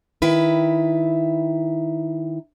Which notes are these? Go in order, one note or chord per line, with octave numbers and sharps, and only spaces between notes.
D#3 E4 B4